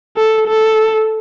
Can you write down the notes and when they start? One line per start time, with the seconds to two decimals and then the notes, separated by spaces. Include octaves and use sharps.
0.17 A4
0.47 A4